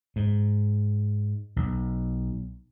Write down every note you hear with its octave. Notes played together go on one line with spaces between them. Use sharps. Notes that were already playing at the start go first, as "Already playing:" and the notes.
G#2
B1